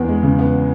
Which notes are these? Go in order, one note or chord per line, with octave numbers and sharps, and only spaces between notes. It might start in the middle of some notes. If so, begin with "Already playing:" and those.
Already playing: E2 B3
G#3
C#3
B3